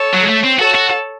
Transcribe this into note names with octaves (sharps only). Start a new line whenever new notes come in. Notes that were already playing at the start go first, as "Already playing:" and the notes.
Already playing: A4 C#5
F#3
G#3
A3
C4
F#4 A4 C#5
F#4